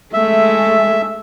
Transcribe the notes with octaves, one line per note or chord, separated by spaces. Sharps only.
G#3 A3 E5